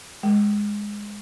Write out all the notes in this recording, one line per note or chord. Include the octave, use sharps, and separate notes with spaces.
G#3